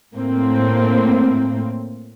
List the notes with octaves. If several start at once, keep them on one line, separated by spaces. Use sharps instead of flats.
A2 A#3 C4